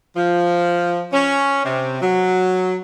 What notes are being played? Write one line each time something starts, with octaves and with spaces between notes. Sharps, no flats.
F3
C#4
C3
F#3